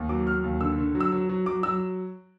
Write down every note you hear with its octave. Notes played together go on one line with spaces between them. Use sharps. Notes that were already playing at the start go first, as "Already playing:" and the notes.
Already playing: D#2
F#3 D6
F#3 F6
D#2
D3 E6
D3
F#3
E6
F#3
F#3
F#3 D6
F#3 E6